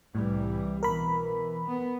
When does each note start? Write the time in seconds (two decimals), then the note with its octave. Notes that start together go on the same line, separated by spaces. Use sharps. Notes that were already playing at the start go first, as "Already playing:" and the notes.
0.15 C2 A2 E3 G3
0.83 B2 E3 A#4 B5
1.68 B3